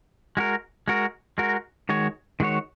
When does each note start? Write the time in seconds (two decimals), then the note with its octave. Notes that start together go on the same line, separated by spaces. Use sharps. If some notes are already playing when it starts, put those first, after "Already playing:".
0.37 G#3 F#4 A#4
0.88 G#3 F#4 A#4
1.38 G#3 F#4 A#4
1.89 D#3 G#3 F#4 C#5
2.40 D#3 G#3 F#4 C#5